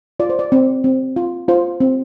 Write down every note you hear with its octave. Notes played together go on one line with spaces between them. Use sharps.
F4 D5
C5
D5
C4
C4
F4
F4 C5
C4